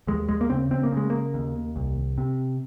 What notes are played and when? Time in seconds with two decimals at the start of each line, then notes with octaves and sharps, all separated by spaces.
0.07 D#2 G#3
0.29 G#3
0.41 A#3
0.50 C#3 C4
0.71 C4
0.83 A#3
0.92 C#3 G#3
1.10 A#3
1.34 D#2
1.76 C2
2.18 C3